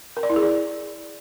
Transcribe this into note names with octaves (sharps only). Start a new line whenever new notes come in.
A#4
D5
E4
G#4
D5